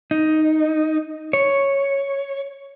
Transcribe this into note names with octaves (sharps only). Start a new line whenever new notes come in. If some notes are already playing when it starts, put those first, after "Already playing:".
D#4
C#5